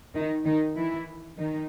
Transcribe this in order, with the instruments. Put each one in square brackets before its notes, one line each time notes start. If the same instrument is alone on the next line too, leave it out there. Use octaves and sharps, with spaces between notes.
[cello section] D#3 D#4
D#3 D#4
E3 E4
D#3 D#4